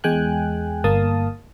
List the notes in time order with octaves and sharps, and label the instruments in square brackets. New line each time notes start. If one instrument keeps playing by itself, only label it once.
[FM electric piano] E2 G#3 G5 G#5 F#6
G1 A#3 F5 A5 D#6